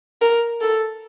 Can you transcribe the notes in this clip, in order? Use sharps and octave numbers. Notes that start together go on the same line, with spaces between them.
A#4
A4